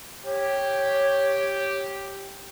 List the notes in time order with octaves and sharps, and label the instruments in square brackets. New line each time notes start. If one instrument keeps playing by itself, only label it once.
[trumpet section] G4 [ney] C#5